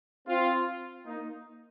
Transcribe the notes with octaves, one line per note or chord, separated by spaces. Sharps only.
C4 F4
A#3 D#4